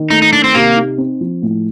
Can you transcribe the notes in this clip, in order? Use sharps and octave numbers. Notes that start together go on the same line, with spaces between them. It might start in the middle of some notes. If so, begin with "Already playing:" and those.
Already playing: D#3
A3 D#4
D#4
D#3 D4
C4
C3 A#3
D#4
C4
F3
A2